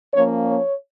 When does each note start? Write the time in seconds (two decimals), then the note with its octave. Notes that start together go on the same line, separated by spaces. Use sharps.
0.14 F3 A#3 C#4 C#5
0.46 C#5